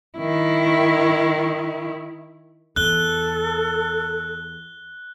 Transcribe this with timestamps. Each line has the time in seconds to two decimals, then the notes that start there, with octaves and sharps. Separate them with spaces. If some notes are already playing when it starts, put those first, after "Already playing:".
0.18 D#3 E4
2.76 E2 A4 F#6 G7